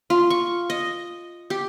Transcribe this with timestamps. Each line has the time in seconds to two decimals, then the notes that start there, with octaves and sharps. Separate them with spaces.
0.10 F4
0.30 C#6
0.70 D#5
1.50 G4